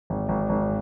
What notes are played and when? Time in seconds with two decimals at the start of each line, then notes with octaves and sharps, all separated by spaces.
0.10 G#1
0.29 G#1
0.49 G#1